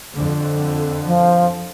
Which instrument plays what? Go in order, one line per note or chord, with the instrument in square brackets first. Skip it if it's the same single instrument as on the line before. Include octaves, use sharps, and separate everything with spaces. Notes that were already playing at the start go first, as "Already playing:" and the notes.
[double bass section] F2 D3
[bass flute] F3